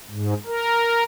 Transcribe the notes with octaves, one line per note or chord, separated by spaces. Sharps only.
G#2
A#4